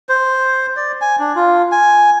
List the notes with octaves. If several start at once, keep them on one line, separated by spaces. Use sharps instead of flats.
C5
D5
G#5
D4
F4
G#5